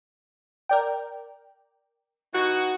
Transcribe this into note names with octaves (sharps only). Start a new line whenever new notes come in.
A#4 D5 G5
E3 D#4 F#4